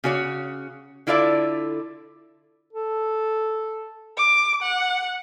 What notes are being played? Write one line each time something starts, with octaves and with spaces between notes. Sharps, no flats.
C#3 F#4 C#5
D3 E4 F4 A4 D5 E5
A4
D6
F#5